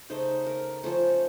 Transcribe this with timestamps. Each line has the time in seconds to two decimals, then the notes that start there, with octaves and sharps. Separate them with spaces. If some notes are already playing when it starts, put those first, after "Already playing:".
0.10 C#3 A3 D#4 C5
0.46 A#4
0.83 F3 A3 C#4 C5